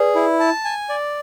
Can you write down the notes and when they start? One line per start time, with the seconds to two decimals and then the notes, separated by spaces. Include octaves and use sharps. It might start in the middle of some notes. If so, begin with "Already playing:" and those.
Already playing: G#4 B4 D5
0.15 E4
0.40 A5
0.65 G#5
0.89 D5